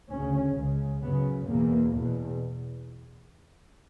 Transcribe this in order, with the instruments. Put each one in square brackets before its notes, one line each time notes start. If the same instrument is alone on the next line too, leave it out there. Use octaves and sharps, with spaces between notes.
[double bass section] D2 C#3 C#4
C#2 C#3
F#2 C#3 B3
E2 B2 A#3
E2 B2